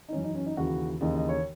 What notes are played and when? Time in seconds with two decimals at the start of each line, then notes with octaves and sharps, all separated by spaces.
0.09 D#4
0.13 F#2 E3 C#4
0.24 D#4
0.35 C#4
0.46 D#4
0.57 D#2 C#3 E3 F#4
1.01 D#2 C#3 E3 D#5
1.14 D#5
1.29 C#5